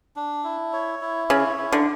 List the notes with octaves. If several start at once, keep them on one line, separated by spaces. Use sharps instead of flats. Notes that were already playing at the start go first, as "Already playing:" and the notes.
D4
E4
C#5
E4
C#3 C#5
E4
D3